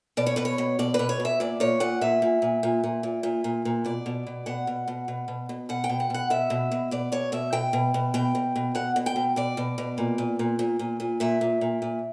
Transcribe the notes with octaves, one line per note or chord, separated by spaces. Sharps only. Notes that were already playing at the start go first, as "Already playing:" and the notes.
B2 D5
C#5
B2 B4
C#5
B2
B2 D5
B4
B2
C#5
B2
E5
A#2 D5
A#2 C#5
A#2 F#5
A#2 E5
A#2
A#2
A#2
A#2
A#2
A#2
A#2
A#2
B2 D5
B2
B2
B2 F#5
B2
B2
B2
B2
B2
B2 F#5
G5
B2
F#5
B2 F#5
B2 E5
B2
B2
B2 D5
B2 C#5
B2 E5
B2 G5
B2
B2
B2 G5
B2
B2
B2 F#5
B2
G5
B2
B2 D5
B2
B2
A#2
A#2
A#2
A#2
A#2
A#2
A#2 E5
A#2
A#2
A#2